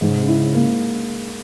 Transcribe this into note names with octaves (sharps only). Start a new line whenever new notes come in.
G#2 E3
C#3
C3
C#3 E4
A#3